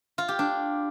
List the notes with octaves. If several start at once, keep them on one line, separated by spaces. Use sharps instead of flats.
F4
G4
D4